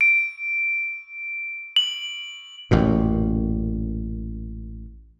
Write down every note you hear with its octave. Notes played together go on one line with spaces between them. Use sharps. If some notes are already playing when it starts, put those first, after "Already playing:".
D7
F#7
A1 F#2 A#2